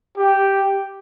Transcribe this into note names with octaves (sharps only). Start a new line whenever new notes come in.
G4